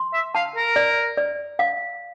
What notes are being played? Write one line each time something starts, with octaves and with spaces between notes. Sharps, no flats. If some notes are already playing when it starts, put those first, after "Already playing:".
Already playing: C6
E5
F5 A5
A#4
D5
D5
F5